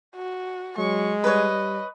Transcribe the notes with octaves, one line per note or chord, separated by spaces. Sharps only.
F#4
F#3 G#3 C#6
G3 B4 C#5 D#5